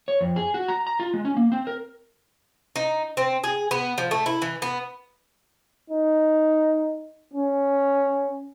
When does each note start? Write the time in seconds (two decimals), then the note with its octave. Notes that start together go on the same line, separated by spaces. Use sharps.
0.08 C#5
0.21 F2
0.36 G#4
0.54 F#4
0.68 A#5
0.87 A#5
1.00 F4
1.14 G#3
1.25 C#4
1.37 A#3
1.52 C4
1.67 A#4
2.76 D#4
3.17 C4
3.44 G#4
3.71 B3
3.98 F3
4.11 A3
4.26 E4
4.42 E3
4.62 B3
5.90 D#4
7.34 C#4